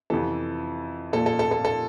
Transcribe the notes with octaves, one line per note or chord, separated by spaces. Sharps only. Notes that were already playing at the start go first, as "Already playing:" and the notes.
F2 C3 E3 A4
A#2 F3 A4
A4
A4
A4
A4